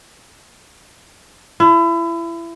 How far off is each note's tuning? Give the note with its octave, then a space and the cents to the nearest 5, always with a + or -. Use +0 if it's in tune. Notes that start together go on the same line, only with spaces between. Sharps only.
E4 +30